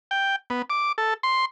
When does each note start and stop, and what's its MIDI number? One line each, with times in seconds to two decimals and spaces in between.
0.11 0.36 79
0.50 0.62 59
0.70 0.92 86
0.98 1.14 69
1.23 1.45 84